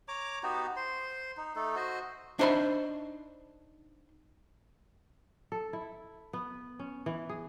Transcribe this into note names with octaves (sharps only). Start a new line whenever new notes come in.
C#5 A#5 D6
B3 D#4 F#4 G4
C5 C6
D#4
A3 D#4 A4
F#4 C5 D#5
D4 D#4 C5 E5 B5
A4
E4
B3
C#4
E3
G#4